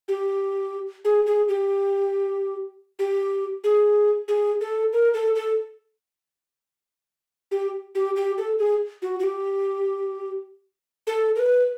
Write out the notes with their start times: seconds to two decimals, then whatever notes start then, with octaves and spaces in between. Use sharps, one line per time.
0.08 G4
1.05 G#4
1.26 G#4
1.48 G4
2.99 G4
3.64 G#4
4.28 G#4
4.61 A4
4.93 A#4
5.14 A4
5.36 A4
7.51 G4
7.95 G4
8.16 G4
8.38 A4
8.59 G#4
9.02 F#4
9.20 F#4
9.24 G4
11.07 A4
11.36 A#4
11.39 B4